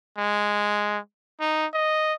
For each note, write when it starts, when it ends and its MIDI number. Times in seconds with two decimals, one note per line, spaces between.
0.18 0.98 56
1.40 1.66 63
1.74 2.13 75